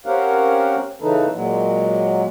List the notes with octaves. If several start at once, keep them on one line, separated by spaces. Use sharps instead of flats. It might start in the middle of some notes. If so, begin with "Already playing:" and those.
C4 C#4 G4 A#4 F5 F#5
C#3 E3 D#4 A4 B4
A#2 F#3 G#3